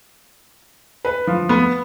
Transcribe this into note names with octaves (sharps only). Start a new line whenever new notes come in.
B4
F3
B3